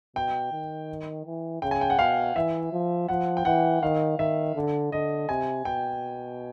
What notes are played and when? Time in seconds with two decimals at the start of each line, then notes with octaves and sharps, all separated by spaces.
0.16 B2 G5
0.52 D#3
1.26 E3
1.62 C#3 G5
1.71 G#5
1.81 G5
1.90 F#5
1.99 B2 F5
2.36 E3 E5
2.73 F3
3.08 F3 F#5
3.37 G5
3.45 E3 F#5
3.82 D#3 F5
4.19 D#3 E5
4.55 D3
4.92 D3 D#5
5.29 C3 G#5
5.65 B2 G5